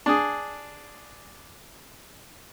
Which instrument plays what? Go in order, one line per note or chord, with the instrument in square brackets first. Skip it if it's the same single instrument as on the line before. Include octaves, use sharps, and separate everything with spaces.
[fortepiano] D4 G#4